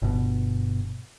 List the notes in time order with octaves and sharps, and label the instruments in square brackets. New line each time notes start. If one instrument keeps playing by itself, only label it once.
[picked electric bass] G1 B2